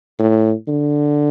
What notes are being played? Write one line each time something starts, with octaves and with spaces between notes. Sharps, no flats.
A2
D3